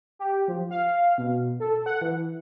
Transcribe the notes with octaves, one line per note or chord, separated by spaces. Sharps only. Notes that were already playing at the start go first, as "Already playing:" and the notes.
G4
F3
F5
B2
A4
F#5
E3